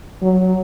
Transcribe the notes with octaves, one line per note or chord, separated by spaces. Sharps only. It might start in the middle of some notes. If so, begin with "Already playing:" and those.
F#3